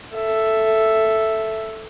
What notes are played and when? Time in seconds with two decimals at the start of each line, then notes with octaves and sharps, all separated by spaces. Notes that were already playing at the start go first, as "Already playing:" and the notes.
0.15 A4 E5